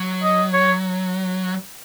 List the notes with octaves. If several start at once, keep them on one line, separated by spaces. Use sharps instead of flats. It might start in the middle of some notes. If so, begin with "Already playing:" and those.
Already playing: F#3
D#5
C#5